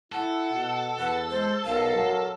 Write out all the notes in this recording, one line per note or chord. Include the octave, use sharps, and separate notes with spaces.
E4 A4 F#5
B2
E2 B4 F#5
G#3 C5
B1 A#4 F5
F#3